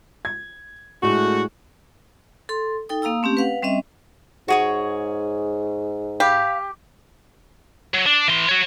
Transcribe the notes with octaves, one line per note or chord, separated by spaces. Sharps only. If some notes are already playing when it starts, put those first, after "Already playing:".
G#6
A2 G#3 A3 D4 F#4
A4 C6
D#4 A4 G5 D#6
A#3 F5 A#5 D#6 E6
A3 C4 C#4 G4
B4 F5 F#5
G3 C4 C#4 D#5 E5
G#2 F#4 G#4 C#5
G4 F5 B5
F#3
D4
E3 C6
F#4 C#5